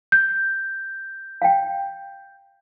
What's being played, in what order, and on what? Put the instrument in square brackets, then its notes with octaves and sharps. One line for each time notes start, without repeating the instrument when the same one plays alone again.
[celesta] G6
[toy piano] F5 G5